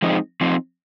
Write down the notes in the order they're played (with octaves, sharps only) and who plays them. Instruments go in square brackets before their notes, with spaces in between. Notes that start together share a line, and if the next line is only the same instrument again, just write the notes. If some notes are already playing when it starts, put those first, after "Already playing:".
[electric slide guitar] F3 G#3 C4 D#4
F3 C4 D#4